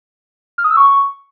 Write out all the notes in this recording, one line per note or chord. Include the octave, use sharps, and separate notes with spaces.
F6
D#6
E6
C#6